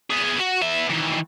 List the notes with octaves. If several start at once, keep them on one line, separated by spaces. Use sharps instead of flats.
B3 G#4
F#4
B3 E5
D#3 E3